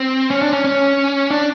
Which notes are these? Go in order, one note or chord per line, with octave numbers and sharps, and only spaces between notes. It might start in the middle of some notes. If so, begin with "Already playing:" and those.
Already playing: C4
C#4
D4
C#4
C#4
D4